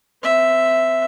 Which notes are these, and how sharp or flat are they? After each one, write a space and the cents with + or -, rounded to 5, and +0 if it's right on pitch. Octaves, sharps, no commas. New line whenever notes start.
C4 -20 E5 +0